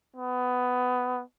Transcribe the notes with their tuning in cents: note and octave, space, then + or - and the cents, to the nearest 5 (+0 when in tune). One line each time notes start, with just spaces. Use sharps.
B3 +15